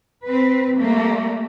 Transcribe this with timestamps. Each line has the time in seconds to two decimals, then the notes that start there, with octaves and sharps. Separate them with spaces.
0.24 C4 B4
0.79 G3 A3 A#3